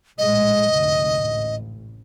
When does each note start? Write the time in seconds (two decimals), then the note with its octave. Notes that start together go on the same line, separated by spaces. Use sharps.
0.18 A#1 A2 G#3 D#5
0.69 F1 D2 G#2
1.19 A1